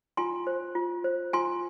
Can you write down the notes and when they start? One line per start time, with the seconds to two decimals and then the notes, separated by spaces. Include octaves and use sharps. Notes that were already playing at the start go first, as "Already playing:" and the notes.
0.17 F4 G#5 C6
0.47 C5
0.75 F4
1.04 C5
1.33 F4 G#5 C6